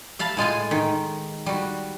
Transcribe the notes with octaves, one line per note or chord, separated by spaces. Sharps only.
E5 F5 A5 B5
A2 G#3 F4 G#5
D#3
G3 F#4